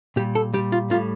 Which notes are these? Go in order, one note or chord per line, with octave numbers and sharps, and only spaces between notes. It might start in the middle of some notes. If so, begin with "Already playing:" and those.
A#2 G3 G4
A4
A#2 G3 G4
F4
A2 G3 F4